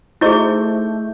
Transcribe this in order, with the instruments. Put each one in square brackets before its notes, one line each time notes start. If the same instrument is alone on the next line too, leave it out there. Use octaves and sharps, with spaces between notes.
[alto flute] A3 [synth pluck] D#4 C5 D#5 [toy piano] E4 G#4 [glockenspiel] C#6 G6